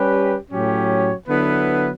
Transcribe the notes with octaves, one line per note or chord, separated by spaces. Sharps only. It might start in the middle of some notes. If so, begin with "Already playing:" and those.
Already playing: G3 C#4 G4 B4
A2 F#3 C#4 G4 C#5
D3 F#3 B3 E4 B4